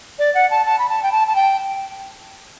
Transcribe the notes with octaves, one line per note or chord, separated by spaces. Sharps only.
D5
F#5
A5
A5
B5
A5
G5
A5
A5
G5